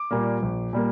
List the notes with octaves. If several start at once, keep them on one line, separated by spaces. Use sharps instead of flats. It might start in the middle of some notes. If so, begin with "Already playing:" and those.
Already playing: D6
A#2 G3 A#3
A#1
A#2 G3 A#3